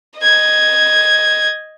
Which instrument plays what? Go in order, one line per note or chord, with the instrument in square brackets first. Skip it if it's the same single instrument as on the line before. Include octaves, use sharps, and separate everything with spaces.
[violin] D#5 G#6